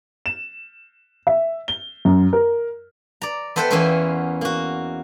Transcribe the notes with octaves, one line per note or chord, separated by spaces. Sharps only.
E7
E5
G7
F#2
A#4
D5 A#5
B3 A4 C5 E5 F#5 G5
E2 A#3 B3 C#4 A#4 C5
A#3 F#4